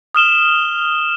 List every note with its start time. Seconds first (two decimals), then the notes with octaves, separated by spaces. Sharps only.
0.15 D#6 F6 E7 G7